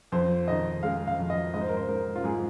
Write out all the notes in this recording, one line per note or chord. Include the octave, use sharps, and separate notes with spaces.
F2 C5
D#3 D#5
G#3 F5
F5
F2
D#5
G#2 D#5
C5
A#4
C5
G#2 A#4
F4
G#2 G#4